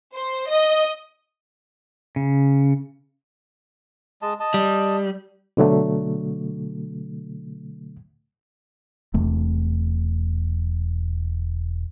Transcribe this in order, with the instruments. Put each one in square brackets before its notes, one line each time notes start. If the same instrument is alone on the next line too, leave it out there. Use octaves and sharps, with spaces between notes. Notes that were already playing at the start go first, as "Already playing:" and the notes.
[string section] C5
D#5
[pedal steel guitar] C#3
[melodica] G#3 D#5 A5
D#5 A5
[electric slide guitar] G3
[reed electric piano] B2 D3 F#3 A3
[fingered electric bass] E1 E2 C3 A3